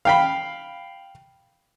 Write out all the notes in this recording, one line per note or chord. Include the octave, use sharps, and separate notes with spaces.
F5 G5 B5